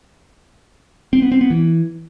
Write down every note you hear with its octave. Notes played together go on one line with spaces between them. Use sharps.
C4
B3
C4
B3
E3